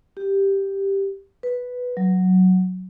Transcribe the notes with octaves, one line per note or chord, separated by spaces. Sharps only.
G4
B4
F#3